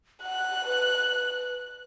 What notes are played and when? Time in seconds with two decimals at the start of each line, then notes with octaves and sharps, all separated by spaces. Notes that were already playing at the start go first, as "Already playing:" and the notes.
0.22 F#5 F#6
0.65 B4